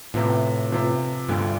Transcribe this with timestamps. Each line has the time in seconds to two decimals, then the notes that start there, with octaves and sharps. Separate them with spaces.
0.14 A2 C3 F3 B3
0.71 C3 F3 B3
1.29 D2 G2 D3 F3